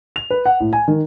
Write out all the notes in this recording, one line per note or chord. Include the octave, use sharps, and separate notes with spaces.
F7
B4
F#5
A2
G#5
D#3